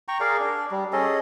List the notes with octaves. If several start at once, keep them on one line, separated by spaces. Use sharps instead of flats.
G5 A#5 C#6
G#4 A#4 D5 F5
D4
G3
C#4 G#4 A4 D#5